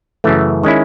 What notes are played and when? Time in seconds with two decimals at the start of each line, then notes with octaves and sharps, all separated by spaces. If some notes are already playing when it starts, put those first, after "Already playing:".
0.24 F#2 C#3 E3 A3
0.63 D#3 G#3 C#4 E4